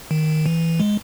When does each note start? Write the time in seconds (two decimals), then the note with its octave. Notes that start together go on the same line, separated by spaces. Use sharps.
0.11 D#3
0.46 E3
0.80 G#3